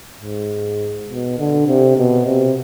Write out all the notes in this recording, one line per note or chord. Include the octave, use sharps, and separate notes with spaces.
G#2
B2
D3
C3
B2
C3